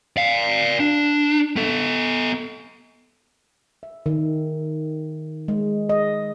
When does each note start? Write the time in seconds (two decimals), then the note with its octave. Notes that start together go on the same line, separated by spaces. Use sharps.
0.17 D5 F5
0.80 D4
1.56 B3 A4
3.83 E5
4.06 D#3
5.48 G#3
5.89 D#5